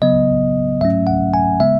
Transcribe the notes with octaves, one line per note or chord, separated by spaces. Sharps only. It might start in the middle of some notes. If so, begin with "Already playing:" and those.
C#3 F#3 B3 D#5
G#2 F#3 A3 C#4 E5
F#5
G#5
C#3 G#3 B3 E5